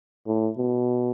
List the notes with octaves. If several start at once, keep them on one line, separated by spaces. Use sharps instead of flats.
A2
B2